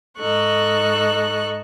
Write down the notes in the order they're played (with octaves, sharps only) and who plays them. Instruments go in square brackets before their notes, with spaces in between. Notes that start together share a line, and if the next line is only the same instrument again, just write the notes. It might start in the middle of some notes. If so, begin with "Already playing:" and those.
[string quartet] G#2 D#4 A4 C#6 F#6